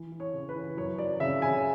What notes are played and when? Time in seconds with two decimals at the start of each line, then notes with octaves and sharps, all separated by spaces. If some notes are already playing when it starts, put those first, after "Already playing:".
Already playing: E3
0.12 E3
0.20 C#5
0.33 C#3
0.49 B4
0.55 E3
0.77 F#2 C#5
0.98 F#3 D5
1.20 C#3 E5
1.42 C#3 G#5